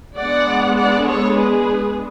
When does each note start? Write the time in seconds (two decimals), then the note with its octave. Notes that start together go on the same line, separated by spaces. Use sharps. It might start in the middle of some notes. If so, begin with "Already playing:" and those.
0.17 G#3 B3 D4 D5 F#5
0.76 D5 F#5
1.06 A4 C#5
1.36 G#4 B4